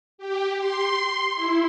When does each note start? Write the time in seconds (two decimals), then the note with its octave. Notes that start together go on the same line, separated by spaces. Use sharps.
0.18 G4
0.59 C6
1.35 E4